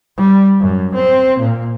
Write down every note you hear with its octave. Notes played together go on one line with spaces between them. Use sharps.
G3
F#2
C4
A#2